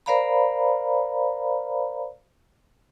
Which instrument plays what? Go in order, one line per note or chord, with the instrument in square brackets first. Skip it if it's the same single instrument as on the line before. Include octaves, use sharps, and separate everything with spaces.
[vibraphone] A#4 C5 D5 F5 A#5 B5